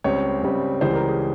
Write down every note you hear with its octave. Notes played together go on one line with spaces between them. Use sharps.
C#2 C#3 G3 C4 C#5
C#2 C#3 G3 C4
C#2 C#3 E3 G3 C5
A#4
G#4